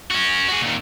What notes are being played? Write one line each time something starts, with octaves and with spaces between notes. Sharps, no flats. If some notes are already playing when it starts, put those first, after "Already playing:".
C#4 F#4
F#4 G#4
A#2 D#3